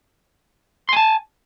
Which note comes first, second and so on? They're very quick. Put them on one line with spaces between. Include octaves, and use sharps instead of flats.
C6 G#5 A5